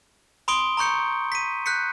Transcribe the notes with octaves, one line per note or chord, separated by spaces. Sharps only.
B5 C6 D#6 D7 G7
A#5 B5 C#6 G6 C#7
B6 D#7
F#6 G6 B6 C#7